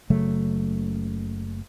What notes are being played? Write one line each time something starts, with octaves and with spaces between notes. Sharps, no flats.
F#1 C#3 F#3 A3